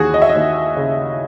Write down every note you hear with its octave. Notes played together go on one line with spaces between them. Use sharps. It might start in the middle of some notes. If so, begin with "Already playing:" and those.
Already playing: D#2 E3 F#4 G#4
D#5
E5
D#5
D#2
C#3